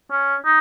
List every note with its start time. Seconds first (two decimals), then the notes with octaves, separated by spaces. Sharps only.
0.11 C#4
0.45 D#4